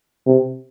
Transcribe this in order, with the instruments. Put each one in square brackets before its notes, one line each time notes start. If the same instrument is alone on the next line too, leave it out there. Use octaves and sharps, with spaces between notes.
[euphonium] C3